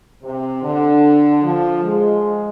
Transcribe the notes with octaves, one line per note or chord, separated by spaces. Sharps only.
C3
D3
F3
G#3